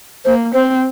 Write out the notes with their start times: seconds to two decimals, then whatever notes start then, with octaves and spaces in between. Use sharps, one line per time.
0.25 A#3 C5
0.54 C4 C5